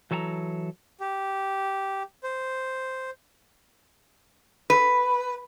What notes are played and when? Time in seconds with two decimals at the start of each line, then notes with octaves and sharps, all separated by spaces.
0.11 E3 F#3 A4 A5 A#5
1.00 G4
2.23 C5
4.70 B4